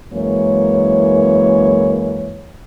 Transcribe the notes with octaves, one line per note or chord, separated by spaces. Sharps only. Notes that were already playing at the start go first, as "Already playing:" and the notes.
F#2 E3 G#3 A#3 C#5